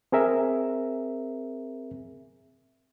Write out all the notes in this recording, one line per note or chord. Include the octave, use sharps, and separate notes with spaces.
C4 G#4 A#4 E5